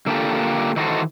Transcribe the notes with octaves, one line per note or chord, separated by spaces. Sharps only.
D3 A#3 D4 F4 G4 A4
D#3 E3 D#4 F#4 A4 C5